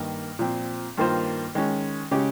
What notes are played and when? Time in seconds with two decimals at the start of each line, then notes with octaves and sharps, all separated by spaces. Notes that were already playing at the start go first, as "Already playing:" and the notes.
Already playing: G2 D#3 A#3
0.39 A#2 F3 C4
0.97 G2 D#3 A#3 F4 C5
1.55 D#3 G#3 C#4
2.11 C#3 G#3 C#4 G4